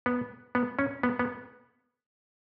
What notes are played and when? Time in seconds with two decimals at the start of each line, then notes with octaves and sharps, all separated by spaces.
0.06 B3
0.55 B3
0.79 C#4
1.03 B3
1.19 B3